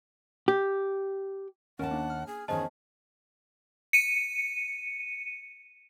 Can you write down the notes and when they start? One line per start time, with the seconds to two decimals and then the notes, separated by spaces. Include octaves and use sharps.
0.48 G4
1.79 D#2 C#4 A#4 F#5 A5
1.91 A#3 D4
2.10 F6
2.27 G#4
2.48 E2 D#3 C#4 G#4 C5 D#5 A5
3.93 C#7 D#7